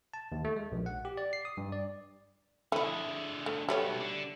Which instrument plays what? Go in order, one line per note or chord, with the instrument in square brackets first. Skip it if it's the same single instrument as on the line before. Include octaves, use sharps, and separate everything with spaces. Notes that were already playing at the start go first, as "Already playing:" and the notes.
[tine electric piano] A5
D#2
A3
G#3
A#1
F#5
G4
D5
C7
D#6
G2
D5
[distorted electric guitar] D3 G#4 [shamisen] A3 E4
[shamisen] A3
[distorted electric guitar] F#3 B3 [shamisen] G3 A3 C#5
[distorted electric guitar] D3 D4